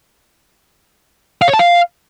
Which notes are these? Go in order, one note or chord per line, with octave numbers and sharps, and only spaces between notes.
F5
C#5
A5
F5